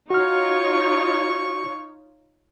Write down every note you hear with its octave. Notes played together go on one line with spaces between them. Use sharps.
D#4 F4 F#4 C#5 C#6 F6